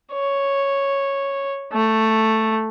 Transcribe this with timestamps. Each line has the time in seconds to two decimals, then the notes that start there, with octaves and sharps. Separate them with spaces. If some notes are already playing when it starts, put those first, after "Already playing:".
0.13 C#5
1.73 A3